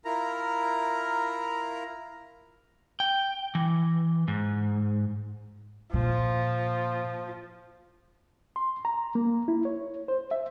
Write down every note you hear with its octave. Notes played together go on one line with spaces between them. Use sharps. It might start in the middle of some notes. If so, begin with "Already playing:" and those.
E4 F4 A#4 A#5
G5
E3
G#2
A#2 F3
C6
A#5
A#3
E4
C#5
C5
E5